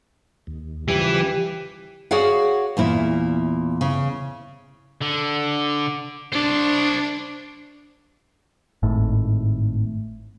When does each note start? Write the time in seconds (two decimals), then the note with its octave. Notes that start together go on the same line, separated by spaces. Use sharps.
0.47 D#2
0.88 C#3 E3 F3 G3 E4 G4
2.11 F#4 G#4 C#5 D5 F5 F#5
2.77 E2 A#2 E4
3.81 C#3
5.01 D3
6.33 D4 C5 D5
8.83 G#1 A2